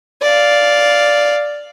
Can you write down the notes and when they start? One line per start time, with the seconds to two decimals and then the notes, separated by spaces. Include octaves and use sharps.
0.22 D5 F5